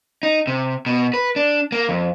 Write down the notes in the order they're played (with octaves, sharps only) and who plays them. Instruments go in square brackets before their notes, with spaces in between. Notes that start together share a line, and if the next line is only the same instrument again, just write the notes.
[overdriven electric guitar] D#4
C3
B2
B4
D4
A#3
F2